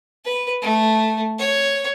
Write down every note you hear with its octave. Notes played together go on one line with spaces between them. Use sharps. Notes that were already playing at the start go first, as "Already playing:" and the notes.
B4
A3
C#5